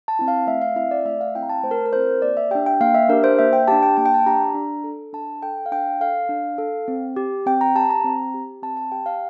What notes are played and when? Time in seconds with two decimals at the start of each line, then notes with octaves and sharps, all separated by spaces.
0.08 A5
0.19 C4 E4
0.28 F5
0.47 A3 E5
0.62 F5
0.76 C4 E4 E5
0.91 D5
1.05 A3 E5
1.21 F5
1.35 C4 E4 G5
1.43 A#5
1.49 A5
1.64 A3 C5
1.71 A#4
1.86 A#4
1.93 C4 E4 C5
2.22 A#3 D5
2.37 E5
2.51 D4 G4 G5
2.66 G5
2.81 A#3 F5
2.94 E5
3.09 D4 G4 A#4
3.24 C5
3.39 A#3 E5
3.53 G5
3.68 D4 G4 A5
3.83 G5
3.97 A#3 A5
4.06 G5
4.14 A5
4.26 D4 G4 A#5
4.55 D4
4.84 A4
5.13 D4 A5
5.43 A4 G5
5.66 F5
5.71 D4 G5
6.01 A4 F5
6.29 D4
6.58 A4
6.88 C4
7.16 G4
7.46 C4 G5
7.61 A#5
7.75 G4 A5
7.90 A#5
8.04 C4
8.34 G4
8.62 C4 A5
8.77 A5
8.92 G4 G5
9.06 F5